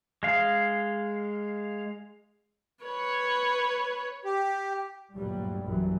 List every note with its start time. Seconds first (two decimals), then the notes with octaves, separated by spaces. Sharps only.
0.23 G#3 F5
2.85 B4 C#5
4.25 G4
5.15 D2 G2 A#2 F#3 G3
5.65 A#1 F#2 E3